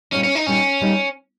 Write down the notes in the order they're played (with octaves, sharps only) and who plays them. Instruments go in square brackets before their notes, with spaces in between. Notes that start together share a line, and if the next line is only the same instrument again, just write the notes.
[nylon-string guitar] A#2 G3 A#3 D#4 [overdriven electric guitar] C#4
[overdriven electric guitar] C#4
D#4
[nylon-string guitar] A#2 G3 A#3 D#4 [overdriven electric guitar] C#4
[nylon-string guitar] A#2 G3 A#3 D#4